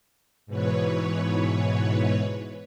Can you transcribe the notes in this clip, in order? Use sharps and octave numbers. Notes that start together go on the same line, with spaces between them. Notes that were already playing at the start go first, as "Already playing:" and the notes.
G#2 B2 E3 B4 C#5